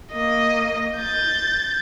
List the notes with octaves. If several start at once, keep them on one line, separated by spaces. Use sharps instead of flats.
A#3 D#5
G6 A6